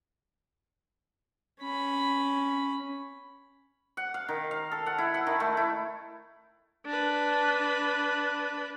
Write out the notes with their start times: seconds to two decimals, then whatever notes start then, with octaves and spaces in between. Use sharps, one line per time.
1.61 C#4 B5
3.97 F#5
4.14 F5
4.28 D#3
4.51 F5
4.72 A4
4.86 F#5
4.98 E4
5.14 F#5
5.27 D#3
5.40 A3
5.57 E4
6.86 D4 B4